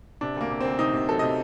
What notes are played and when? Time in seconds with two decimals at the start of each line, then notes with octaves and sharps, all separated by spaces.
0.21 C3 D4
0.36 D2 A#3
0.51 C3
0.61 D2 C4
0.79 C3 D#4
0.93 C3
1.09 F#3 A4
1.19 C3 D#5